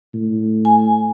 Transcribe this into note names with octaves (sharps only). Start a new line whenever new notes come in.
A2
G#5